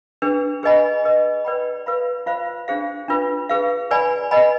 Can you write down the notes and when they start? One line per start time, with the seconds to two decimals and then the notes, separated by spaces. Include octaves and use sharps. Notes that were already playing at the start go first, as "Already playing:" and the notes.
0.22 D4 G#4 B4
0.63 G#4 B4 D#5 G#5 B5
1.04 G#4 B4 D#5
1.45 B4 D5 G5 B5
1.86 B4 F5 B5
2.26 F4 C5 F5 B5
2.68 D4 G#4 C5 F5
3.08 D4 F4 B4
3.49 G#4 B4 F5
3.91 B4 D5 G#5 B5
4.31 B4 D#5 G#5 B5